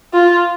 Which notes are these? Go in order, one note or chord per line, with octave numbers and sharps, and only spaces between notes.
F4